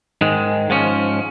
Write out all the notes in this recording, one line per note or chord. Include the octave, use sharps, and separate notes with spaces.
G#2 D#3 G#3
G#2 F3 C#4